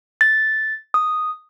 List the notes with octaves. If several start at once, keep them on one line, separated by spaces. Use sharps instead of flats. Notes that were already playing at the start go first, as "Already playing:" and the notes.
A6
D#6